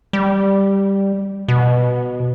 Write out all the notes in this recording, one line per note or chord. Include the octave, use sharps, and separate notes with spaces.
G3
B2